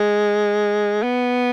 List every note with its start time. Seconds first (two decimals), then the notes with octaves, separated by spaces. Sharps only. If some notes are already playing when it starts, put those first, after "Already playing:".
Already playing: G#3
1.03 B3